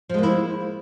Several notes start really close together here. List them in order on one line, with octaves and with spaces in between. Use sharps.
F3 G#3 A#3 E4